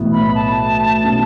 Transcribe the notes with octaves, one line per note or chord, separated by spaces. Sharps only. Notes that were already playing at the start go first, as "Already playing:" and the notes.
Already playing: B1 A2 E3 B3 E4
B5
A5
B2 A3 C#4